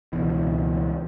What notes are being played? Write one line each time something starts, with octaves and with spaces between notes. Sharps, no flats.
C#2 B2 E3